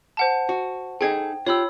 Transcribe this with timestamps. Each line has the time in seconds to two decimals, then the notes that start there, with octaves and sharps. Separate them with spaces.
0.17 C5 F#5 A5
0.49 F#4
1.01 D#4 G#4 A4 G5 G#6
1.46 F4 G4 C#5 B5 E6